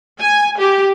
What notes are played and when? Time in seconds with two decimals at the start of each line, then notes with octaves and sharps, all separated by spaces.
0.20 G#5
0.59 G4